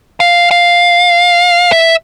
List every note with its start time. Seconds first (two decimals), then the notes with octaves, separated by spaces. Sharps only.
0.20 F5
0.51 F5
1.72 E5